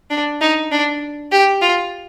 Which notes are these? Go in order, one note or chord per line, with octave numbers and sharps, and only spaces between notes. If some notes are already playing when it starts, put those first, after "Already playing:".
D4
D#4
D4
G4
F4